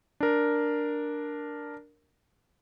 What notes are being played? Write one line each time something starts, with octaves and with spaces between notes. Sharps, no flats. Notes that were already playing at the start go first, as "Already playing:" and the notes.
D4 A#4